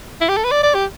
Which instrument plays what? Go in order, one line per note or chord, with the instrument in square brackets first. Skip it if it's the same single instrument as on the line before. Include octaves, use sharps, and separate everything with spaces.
[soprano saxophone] E4
G4
A4
B4
D5
D5
G4